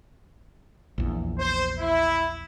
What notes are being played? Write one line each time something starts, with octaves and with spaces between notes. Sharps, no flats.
A#1 E2
C5
E4